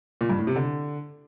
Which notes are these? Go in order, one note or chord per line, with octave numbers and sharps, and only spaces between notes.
A#2
G2
A2
C3
D3